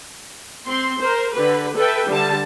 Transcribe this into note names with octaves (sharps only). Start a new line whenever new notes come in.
C4 C6
A#4 C5
D3 G4 B4
A4 B4 E5 G5
D3 G3 A5